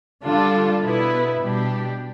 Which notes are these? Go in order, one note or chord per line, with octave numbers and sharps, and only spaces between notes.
D3 G3 D4 F4 A4
B2 B3 E4 B4
B2 G3 D4 G4